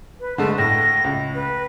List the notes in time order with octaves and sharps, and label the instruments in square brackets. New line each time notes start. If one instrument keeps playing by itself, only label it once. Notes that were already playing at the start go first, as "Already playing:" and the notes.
[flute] B4
[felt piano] D3 G#3 A3 [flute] A5
[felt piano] A2 [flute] A#6
[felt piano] C#2
[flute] B4